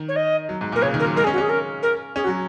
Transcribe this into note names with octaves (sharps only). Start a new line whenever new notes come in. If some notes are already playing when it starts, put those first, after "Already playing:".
Already playing: D#3
C#5
D#5
F#3
G#2
A#2
A#4
C#3 C#5
D#3
A#4
F#3
G#3 A#4
C#4 G#4
F#4
C#4 G#4
A#4
A#4
C#4 G#4
F#3 F#4